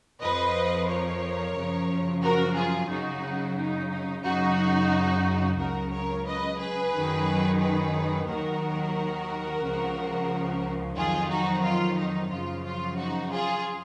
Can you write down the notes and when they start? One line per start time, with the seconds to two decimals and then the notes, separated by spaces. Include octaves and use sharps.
0.21 F2 F3 B4 D#5
0.88 A#4 C#5
1.55 F#2 C#3 F3
2.23 F#4 A#4
2.56 F4 G#4
2.89 F#2 C#3 F#3 D#4 F#4
3.57 D#4
3.91 D#4
4.24 F#2 C#3 F#3 D#4 F#4
5.58 C#2 C#3 F#3 F#4 A#4
5.92 A#4 C#5
6.26 B4 D#5
6.59 G#4 B4
6.93 F#2 D#3 F#3
7.61 G#4 B4
8.28 D#2 D#3 F#3 F#4 A#4
9.61 C#2 C#3 F3
10.97 F2 D#3 F#3 F4 G#4
11.30 D#4 F#4
11.63 F4
11.98 D#4
12.31 F#2 C#3 F3 F4
12.65 F4
12.98 D#4 F#4
13.32 F4 G#4